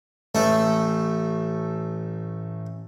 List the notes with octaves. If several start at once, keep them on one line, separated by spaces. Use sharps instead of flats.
A1 A3 A4